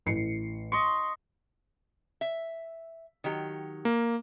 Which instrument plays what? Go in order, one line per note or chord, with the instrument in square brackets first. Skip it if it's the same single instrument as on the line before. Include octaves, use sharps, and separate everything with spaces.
[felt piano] A1 C7 C#7
[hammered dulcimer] D#5 C6 C#6
[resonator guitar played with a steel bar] E5
D#3 F#3 G4
[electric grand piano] A#3